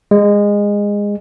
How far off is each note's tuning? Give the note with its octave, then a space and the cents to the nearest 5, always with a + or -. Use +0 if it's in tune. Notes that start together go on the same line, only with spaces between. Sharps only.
G#3 -20